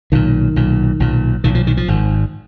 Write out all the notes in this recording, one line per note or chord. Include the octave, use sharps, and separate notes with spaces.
B1 A#2 D#3
B1 A#2
B1 A#2
B1 A#2 D#3
F3
D#3
F3
G#1 G#2